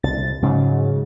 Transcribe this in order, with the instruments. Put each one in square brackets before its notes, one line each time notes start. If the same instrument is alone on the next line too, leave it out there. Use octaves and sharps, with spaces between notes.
[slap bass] C2 [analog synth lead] A6
[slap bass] G#2 F#3 [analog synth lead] C#3